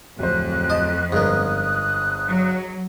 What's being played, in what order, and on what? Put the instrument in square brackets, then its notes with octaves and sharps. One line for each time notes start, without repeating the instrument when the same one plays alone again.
[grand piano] D1 C5 [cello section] F2 [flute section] F#6
[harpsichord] D#5 A5
[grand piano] G1 A#4 [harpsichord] G#2 B3 [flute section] D#6 F#6
[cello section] F#3